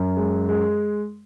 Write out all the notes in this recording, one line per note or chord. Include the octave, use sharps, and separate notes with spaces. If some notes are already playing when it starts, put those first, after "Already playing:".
Already playing: F#2
G#3
G#3